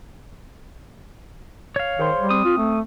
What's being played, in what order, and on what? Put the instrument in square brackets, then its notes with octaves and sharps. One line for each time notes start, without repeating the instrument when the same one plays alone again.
[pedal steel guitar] C#5 F5
[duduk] D#3 [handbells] G#4 C5 C6
[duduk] G3
[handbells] C4 [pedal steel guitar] D#6
[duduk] F4
A3